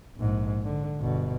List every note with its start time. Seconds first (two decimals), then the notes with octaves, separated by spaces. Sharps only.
0.17 A#1 G#2
0.64 D3
1.01 G1 B2